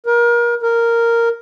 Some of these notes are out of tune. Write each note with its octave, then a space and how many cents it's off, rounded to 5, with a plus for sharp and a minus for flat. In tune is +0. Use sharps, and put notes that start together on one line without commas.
A#4 +30
A#4 -5